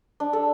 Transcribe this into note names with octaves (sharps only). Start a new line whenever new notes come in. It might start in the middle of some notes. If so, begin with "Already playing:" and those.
D4
A4